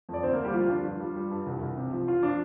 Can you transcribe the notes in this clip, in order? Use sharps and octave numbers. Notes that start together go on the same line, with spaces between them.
F2 D5
D2 C4 C5
A#3 A#4
D2
G3 G4
F3 F4
F3 D4
G2 F4
G3
G3
G2
C2
C2
C3
F3
F3 F4
F3 D4